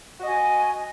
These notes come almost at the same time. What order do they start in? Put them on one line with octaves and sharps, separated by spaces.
F#4 D#5 G#5